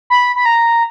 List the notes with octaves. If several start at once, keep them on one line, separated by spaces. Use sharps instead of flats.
B5
B5
A#5